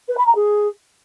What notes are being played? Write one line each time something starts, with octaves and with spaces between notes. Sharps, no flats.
B4
B5
A#5
G#4